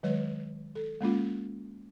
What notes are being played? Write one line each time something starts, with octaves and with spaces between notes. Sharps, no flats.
D#3 F#3 G#3 B4 C#5
A4
G#3 A#3 C#4 F4